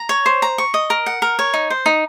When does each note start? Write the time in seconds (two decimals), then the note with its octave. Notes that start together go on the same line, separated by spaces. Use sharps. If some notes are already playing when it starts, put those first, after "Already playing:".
Already playing: A#5
0.09 C#5
0.26 C5
0.42 A#5
0.58 C#6
0.74 D#5
0.90 A#4
1.06 F#5
1.22 A#4
1.39 C#5
1.54 D#4
1.70 C5
1.86 D#4